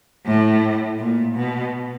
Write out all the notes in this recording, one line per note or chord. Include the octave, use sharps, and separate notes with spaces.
A2
A#2
B2